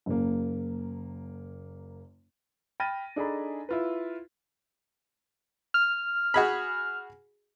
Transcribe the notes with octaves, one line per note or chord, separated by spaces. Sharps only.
F#1 A#3
G5 B5 F6 A6 A#6 D#7
D4 D#4 G#4 A4 A#5 B5
E4 F4 B4
F6
F#4 G#4 B5